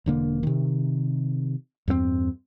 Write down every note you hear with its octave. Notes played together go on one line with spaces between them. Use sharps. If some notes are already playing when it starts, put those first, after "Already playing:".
E1 D3 A#3
C3 D#3
E2 G2 A#3 C4